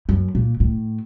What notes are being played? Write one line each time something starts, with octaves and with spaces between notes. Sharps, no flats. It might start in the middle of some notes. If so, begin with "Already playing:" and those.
F#2
A#2
A2